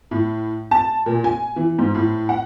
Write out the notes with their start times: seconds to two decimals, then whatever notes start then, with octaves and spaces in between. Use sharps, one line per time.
0.11 A2
0.71 A5
1.06 A#2
1.24 G#5
1.56 E3
1.78 G#2
1.94 A2
2.29 F#5